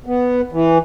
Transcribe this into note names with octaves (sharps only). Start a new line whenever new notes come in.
B3
E3